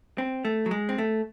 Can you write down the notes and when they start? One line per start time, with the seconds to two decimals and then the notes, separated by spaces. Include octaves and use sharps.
0.18 C4
0.45 A3
0.66 F#3
0.71 G#3
0.89 C4
0.98 A3